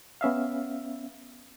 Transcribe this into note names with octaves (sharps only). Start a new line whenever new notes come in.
B3 C#4 E5 F5